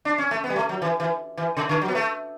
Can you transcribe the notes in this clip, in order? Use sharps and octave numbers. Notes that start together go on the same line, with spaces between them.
D4
C#4
A3
B3
G3
A3
F#3
E3
E3
E3
C#3
D3
F#3
B3
A3